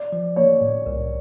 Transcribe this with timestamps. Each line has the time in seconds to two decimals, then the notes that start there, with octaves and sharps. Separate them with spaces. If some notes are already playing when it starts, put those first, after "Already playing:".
Already playing: D5
0.13 F3
0.36 A#3 C#5
0.61 A2
0.86 C2